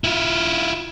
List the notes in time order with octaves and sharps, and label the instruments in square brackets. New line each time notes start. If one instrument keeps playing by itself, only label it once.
[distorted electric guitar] E4 F4